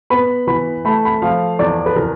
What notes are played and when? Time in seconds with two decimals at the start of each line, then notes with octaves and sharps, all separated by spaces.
0.10 B3 B5
0.47 E3 B5
0.85 A3 B5
1.05 B5
1.22 F3 F5
1.59 E2 D5
1.86 B4
1.96 E3 A#4